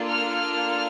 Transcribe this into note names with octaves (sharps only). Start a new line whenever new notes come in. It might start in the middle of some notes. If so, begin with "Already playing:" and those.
Already playing: A#3 D4 F4 A4
F6